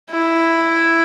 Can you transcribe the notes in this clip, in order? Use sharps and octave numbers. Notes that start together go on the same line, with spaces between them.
E4